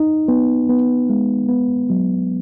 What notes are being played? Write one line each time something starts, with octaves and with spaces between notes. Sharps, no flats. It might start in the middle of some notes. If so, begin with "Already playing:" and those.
Already playing: D#4
B3
B3
G#3
B3
F#3